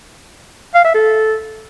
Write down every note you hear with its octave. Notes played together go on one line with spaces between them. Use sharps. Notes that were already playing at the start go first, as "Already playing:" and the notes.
F5
E5
A4